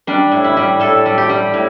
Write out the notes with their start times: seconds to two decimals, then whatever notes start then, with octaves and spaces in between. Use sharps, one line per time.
0.07 G3 D4
0.32 A2
0.44 E4
0.57 G3
0.80 A2 A4
1.06 G3
1.18 G4
1.30 G3
1.54 A2